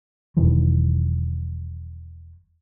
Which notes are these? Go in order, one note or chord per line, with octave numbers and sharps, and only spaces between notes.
E1 D#3 E3 F#3